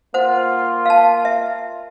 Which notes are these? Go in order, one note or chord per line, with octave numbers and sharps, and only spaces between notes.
A#3 F4 C5 F#5
F5 A5
E5